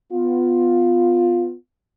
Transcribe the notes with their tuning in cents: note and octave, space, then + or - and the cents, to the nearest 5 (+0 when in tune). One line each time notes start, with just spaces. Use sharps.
B3 +20 F4 +10